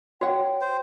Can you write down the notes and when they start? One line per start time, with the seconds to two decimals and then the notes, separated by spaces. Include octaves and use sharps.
0.21 F#4 C#5 F#5 G5
0.61 C5